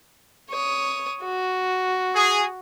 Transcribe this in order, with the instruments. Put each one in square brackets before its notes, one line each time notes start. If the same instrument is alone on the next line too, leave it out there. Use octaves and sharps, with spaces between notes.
[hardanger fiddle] C#5 D#6
F#4
[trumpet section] G#4